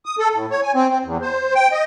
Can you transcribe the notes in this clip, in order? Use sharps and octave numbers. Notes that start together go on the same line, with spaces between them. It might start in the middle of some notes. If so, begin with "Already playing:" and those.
D#6
A4
A2
C#5
G#5
C4
C4
E2
C5
G5
D#5